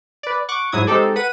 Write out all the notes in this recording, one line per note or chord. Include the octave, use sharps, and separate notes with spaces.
B4 D5
F#5 C#6 D6
G#2 F#3 E4 D#6 G#6
G#3 C4 D#4 G4 A4 D5
B4 F#5 D#7